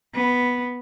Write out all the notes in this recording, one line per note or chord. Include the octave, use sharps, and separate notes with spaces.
B3